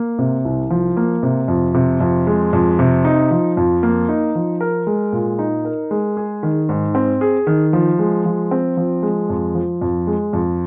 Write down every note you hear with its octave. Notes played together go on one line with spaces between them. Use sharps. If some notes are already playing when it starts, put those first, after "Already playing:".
Already playing: A#3
C3
C2
F3
A#3
C3
F2
C3
F2
G#3
F2
C3
D#4
F3
F2
A#3
D#4
F3
A#4
G#3
A#2
D#4
A#4
G#3
G#4
D#3
G#2
C4
G#4
D#3
F3
G#3
F3
C4
F3
G#3
F2
F3
F2
G#3
F2